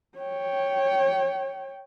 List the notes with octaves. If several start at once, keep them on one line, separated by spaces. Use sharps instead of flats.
C#5 G5